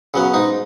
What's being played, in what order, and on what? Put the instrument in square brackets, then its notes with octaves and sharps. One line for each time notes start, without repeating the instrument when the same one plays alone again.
[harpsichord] C#3 F#3 B3
G#2 D#4